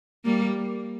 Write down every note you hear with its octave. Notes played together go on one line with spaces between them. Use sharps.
G3 A#3